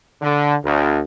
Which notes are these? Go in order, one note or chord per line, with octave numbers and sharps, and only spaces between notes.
D3
D2